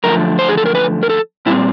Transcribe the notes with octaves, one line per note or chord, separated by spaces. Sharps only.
F#2 D3 F3 A3 A#4
C5
G#4
A4
A#4
B4
A#4
A4
A#2 G3 C4 E4